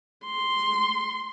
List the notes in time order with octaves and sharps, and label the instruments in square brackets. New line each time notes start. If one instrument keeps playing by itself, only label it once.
[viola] C6